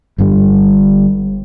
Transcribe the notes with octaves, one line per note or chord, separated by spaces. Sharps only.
G1 G2 G3